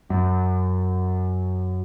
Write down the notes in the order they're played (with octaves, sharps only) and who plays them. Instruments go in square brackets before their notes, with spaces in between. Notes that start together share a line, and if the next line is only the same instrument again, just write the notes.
[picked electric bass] F#2